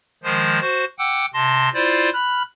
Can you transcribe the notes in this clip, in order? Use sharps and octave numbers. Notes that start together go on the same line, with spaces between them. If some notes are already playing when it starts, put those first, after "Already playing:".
D#3 F3 G#3 C5
F#4 C5
F#5 G5 D6 E6
C3 A5 C6 A#6
E4 F4 C5 D5
B5 F6 F#6